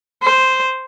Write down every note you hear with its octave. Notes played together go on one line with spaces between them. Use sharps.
C5